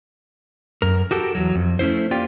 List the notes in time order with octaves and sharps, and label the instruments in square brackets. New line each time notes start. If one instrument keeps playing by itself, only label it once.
[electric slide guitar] F#2 A#4
F#4 G4 A4 A#4
E2 F#3
F2
A3 C#4 E4 C5
A#3 F4 G4 D5 G5